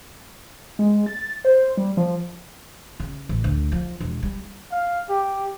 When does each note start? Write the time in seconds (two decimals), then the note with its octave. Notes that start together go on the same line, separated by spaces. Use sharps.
0.79 G#3
1.06 A6
1.45 C5
1.77 G3
1.97 F3
3.00 C#3
3.29 A1
3.44 D2
3.72 F3
4.01 E1
4.23 G3
4.72 F5
5.10 G4